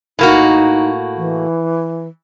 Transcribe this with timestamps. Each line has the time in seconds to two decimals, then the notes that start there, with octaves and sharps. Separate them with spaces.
0.19 A2 A#3 D#4 F#4
1.16 E3